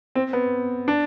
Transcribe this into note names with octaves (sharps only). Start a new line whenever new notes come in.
C4
B3
D4